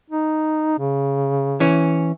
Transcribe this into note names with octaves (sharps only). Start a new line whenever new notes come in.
D#4
C#3
E3 C#4